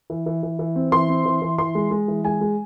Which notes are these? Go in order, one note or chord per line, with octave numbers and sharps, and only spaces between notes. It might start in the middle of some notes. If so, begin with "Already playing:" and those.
E3
E3
E3
E3
C4
E3 C6
C4
E3
E3
E3 C6
G#3
G#3
E3
G#3 G#5
G#3